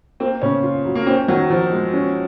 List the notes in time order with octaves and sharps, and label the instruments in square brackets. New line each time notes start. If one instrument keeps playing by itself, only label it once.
[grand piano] A#3 [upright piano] C4
[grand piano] C#3 [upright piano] C#4
[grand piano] F4
F#3
[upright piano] A#3
[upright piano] C4 [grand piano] C#4
[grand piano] D#3 [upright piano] F#3
[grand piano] D#3 [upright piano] F3
[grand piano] G#3
C#4